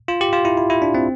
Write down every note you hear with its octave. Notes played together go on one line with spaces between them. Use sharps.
F4
G4
F4
E4
E4
E4
D4
C4